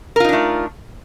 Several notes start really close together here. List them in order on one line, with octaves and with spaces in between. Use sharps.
A#4 F4 D#4 D4 A3